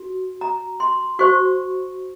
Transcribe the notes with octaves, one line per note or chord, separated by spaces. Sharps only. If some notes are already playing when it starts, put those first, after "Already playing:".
Already playing: F#4
A#5
C6
F#4 C5 C#6